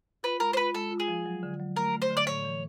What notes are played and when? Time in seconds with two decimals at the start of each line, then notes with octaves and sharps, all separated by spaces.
0.23 F4 B4
0.40 G#3 A#4
0.53 C5
0.57 F4 B4
0.75 G#3 A4
0.91 F4
1.00 G#4
1.08 F3
1.26 F#3
1.43 D3
1.60 F#3
1.76 A3 A#4
1.93 A3
2.02 C5
2.10 D3
2.17 D5
2.27 A2 C#5
2.44 E3